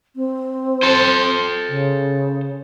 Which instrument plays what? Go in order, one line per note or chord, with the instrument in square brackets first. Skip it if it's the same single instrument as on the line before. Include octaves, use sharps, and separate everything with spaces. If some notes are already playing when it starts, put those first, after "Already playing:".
[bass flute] C4
[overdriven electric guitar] A4 C5
[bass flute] C#3